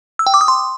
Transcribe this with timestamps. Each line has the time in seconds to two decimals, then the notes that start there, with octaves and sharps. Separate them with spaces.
0.19 E6
0.27 G5
0.34 D6
0.41 D#6
0.48 C6